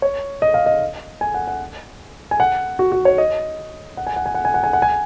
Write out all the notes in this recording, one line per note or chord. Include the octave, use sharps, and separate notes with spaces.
C#5
D#5
F5
D#5
G#5
F#5
F#5
G#5
F#5
F#4
F#4
C#5
D#5
F#5
G#5
F#5
G#5
F#5
G#5
F#5
G#5
F#5
G#5